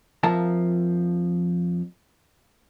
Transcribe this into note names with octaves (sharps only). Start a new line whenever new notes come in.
F2 F3 A#4 E5 A5 A#5